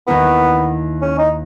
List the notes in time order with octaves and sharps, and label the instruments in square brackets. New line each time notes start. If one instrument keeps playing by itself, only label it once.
[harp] D#2 D#3 A#3 E4 [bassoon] B3
[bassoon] C#4
D#4